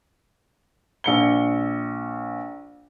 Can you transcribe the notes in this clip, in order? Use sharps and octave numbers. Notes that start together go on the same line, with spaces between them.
A#1 C#7 G7